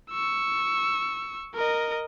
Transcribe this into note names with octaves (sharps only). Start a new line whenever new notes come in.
C#6 E6
A#4 D#5